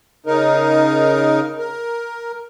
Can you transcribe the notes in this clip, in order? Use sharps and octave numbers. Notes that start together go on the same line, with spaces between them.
C#3 D#4 A#4
A#4